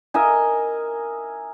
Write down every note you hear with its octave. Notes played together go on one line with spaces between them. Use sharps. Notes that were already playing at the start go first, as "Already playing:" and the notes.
A#4 D#5 E5 G#5